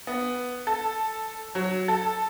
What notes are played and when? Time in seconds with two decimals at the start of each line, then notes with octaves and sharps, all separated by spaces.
0.07 B3
0.67 A4
1.55 F#3
1.88 A4